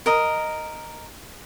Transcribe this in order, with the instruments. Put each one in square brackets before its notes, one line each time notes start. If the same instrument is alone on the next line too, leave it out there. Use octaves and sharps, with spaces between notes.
[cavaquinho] A#4 D#5